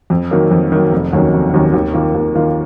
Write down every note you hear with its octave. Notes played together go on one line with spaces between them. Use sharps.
F2
D#3 F#3 A#3
F2
D#3 F#3 A#3
F1
D#2 D#3 F#3 C#4
F1
D#2 D#3 F#3 C#4
D#2
D#3 A#3 F4
D#2
D#3 A#3 F4